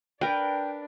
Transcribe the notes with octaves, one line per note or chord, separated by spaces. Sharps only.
D4 A#4 B4 D5 G5